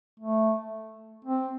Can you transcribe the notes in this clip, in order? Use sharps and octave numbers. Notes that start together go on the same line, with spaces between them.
A3
C4